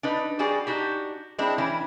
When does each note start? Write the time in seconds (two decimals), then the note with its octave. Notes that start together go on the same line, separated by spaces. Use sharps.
0.03 D4 D#4 B4
0.39 G3 F#4 G#4 D5
0.67 D4 D#4 F#4 G4
1.39 G#3 C4 D4 E4
1.58 E3 C#4 E4